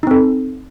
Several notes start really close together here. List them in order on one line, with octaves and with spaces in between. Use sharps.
D#4 C4 A4